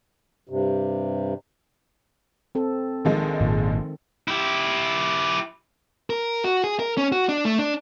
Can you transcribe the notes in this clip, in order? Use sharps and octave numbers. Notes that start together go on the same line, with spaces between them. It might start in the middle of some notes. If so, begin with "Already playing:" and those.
G2 C3
C4 A4
A#1 D#3 F3 G#3
G#1 A#2
E4 G4
A#4
F#4
G#4
A#4
C#4
F#4
D4
A3
D4